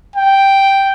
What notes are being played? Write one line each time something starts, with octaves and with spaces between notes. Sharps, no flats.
G5